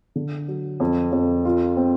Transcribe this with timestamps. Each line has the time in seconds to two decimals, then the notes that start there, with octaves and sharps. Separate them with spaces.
0.16 D3
0.48 F#3
0.80 F2
1.12 F2
1.45 F4
1.77 C4